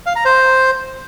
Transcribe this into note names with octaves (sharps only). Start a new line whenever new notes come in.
F5
A#5
C5